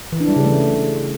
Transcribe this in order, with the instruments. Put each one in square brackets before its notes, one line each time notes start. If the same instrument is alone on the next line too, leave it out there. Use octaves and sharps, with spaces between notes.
[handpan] E3
D4
G3
C#3
A3